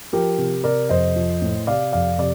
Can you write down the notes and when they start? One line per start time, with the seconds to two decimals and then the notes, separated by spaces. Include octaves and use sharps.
0.13 F3 G4 A#4
0.38 C3
0.64 C3 A#4 D5
0.89 F2 C5 D#5
1.16 F3
1.42 A2
1.67 C3 D5 F5
1.92 F2 D5 F5
2.18 C3 D5